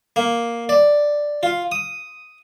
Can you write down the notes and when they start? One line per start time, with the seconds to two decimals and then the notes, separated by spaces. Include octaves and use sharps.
0.16 A#3
0.69 D5
1.43 F4
1.72 D#6